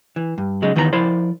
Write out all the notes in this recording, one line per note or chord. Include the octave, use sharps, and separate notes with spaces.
E3
G2
C#3 F#3 G#3 D#4
D#2 D#3 E3 B3 A#4 A#5
F3 E4 A#4 C5 D5